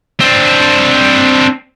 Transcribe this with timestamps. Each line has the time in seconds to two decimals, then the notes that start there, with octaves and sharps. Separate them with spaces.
0.20 C4 D4